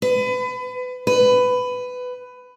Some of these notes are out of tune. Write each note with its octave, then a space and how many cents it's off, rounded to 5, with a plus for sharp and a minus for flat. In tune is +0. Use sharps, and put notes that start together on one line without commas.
B4 +30
B4 +15